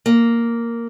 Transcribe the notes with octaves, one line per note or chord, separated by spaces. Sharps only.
A#3